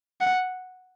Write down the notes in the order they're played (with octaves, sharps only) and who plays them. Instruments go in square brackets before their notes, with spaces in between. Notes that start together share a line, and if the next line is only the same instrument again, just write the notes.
[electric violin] F#5